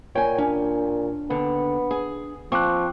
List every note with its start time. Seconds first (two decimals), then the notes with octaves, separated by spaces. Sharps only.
0.15 A#2 C#5 G5 G#5
0.38 C#4 D4
1.30 D#2 D3 B3
1.91 G#4
2.52 F3 C4 C#6 D6 F#6